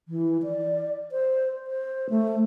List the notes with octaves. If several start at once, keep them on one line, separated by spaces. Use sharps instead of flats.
E3
D5
C5
C5
A3